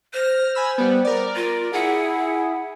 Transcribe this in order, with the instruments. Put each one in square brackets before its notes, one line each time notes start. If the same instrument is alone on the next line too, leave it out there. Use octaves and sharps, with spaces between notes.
[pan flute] C5 [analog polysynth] F6 A#6
[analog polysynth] G#5 B5 E6
G3 B3
A#4 D5
[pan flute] F4
[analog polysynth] E4 G#4 [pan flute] F#5